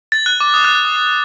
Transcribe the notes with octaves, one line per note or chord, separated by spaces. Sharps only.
A6
F#6
D6
D#6
F#6
F#6
D#6
D#6